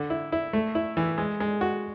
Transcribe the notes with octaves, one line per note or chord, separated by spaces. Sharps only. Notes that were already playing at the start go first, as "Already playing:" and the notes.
Already playing: D3
E4
E4
A3
E4
E3
G#3
G#3
F#4